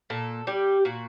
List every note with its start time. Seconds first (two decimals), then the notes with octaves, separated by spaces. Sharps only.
0.10 A#2 A4
0.47 G3 G4
0.85 A#2 F#4